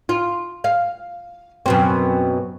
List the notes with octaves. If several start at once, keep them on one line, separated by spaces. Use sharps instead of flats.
F4
F5
F#2 B2 C4